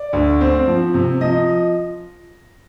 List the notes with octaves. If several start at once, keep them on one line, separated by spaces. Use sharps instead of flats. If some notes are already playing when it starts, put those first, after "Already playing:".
Already playing: D5
D2
C4
F3
C3
F3 D#5